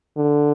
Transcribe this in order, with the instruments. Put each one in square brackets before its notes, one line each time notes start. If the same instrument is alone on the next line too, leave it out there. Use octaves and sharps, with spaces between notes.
[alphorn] D3